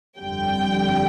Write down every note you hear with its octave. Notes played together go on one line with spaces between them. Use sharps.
G1 F2 D3 G3 G5